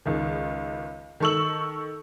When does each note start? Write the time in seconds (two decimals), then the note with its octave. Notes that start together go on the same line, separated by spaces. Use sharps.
0.05 C#2 D#3
1.20 D#3 A4 C#6 E6 F#7